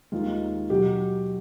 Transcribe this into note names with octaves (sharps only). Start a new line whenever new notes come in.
D#2 D#3 G#3 F4
B2 F#3 G4